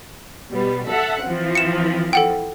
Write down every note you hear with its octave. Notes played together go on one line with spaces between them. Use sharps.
B2 G3 B3
A4 E5 F#5
E3 F3 C4
C#7 E7
A4 F#5 G5